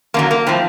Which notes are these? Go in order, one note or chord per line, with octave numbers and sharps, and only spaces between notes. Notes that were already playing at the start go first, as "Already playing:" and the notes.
F#2 D3 F#3 A#3
A#3
A2 F3 C4